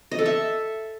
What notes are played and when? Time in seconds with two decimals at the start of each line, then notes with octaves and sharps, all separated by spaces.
0.11 D#5
0.19 A4
0.26 E5